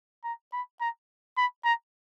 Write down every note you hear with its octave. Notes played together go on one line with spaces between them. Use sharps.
A#5
B5
A#5
B5
A#5